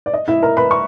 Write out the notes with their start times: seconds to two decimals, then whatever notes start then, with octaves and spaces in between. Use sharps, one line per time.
0.06 D5
0.14 D#5
0.28 E4 E5
0.42 A#4 A#5
0.57 B4 B5
0.71 C#6